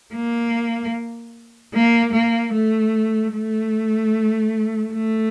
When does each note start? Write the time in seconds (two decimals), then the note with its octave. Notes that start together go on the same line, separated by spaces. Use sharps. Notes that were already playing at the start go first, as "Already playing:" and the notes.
0.14 A#3
1.74 A#3
2.13 A#3
2.53 A3
3.33 A3
4.93 A3